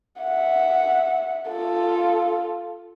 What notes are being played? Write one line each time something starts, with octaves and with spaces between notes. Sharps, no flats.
E5 F#5
F4 A4